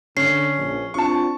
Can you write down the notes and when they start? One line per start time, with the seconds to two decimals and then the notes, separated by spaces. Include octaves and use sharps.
0.17 D3 C#4 C7
0.57 A#1
0.94 C4 D4 F4 A5 C#6